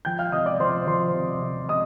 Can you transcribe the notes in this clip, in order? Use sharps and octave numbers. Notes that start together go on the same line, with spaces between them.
F3 G5 G6
F5 F6
C3 D#5 D#6
D5 D6
F3 C5 C6
F3 C5 C6
C3
C3
C3 D#5 D#6